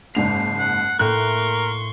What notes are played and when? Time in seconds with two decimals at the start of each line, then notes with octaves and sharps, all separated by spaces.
0.15 F#1 G#2 C7 F7
0.59 F#5
0.99 A2 A#3 A#4 C6 C#6 F#6 G6